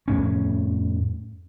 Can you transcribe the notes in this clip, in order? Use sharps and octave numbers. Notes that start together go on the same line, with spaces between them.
F2 A2 C#4